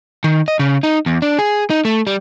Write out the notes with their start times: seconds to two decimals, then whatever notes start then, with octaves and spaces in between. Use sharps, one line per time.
0.24 D#3
0.48 D#5
0.59 C#3
0.83 D#4
1.06 E2
1.22 D4
1.39 G#4
1.70 D#4
1.85 A3
2.07 G3